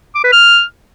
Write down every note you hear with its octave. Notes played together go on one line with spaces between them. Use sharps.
D6
B4
F6